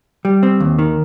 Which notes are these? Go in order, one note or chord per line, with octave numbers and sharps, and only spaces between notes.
G3
C4
D#2
D#3